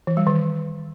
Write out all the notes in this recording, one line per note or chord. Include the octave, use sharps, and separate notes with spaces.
E3
G3
D#3